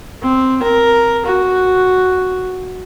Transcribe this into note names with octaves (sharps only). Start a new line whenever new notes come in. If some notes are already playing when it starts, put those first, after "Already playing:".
C4
A#4
F#4